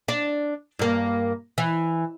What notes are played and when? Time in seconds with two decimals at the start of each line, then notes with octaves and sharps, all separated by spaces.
0.08 D4 D5
0.79 G2 A#3
1.58 E3